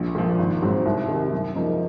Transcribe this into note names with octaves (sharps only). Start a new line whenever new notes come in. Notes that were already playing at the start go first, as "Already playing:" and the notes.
Already playing: A#1
A#2 F3
G#1
G#2 F#3 C4
C2
C3 D#3
F#2
C#3 F3 A#3 D#4